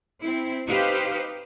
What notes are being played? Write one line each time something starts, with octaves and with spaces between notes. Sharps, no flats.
C4 E4
D#4 G4 B4 C5 D#5 F5